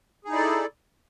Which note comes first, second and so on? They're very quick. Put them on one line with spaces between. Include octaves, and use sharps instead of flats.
G#4 D#4 E4 D5 A4